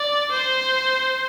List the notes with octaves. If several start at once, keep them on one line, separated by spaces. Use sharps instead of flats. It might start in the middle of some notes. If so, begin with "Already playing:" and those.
Already playing: D5
C5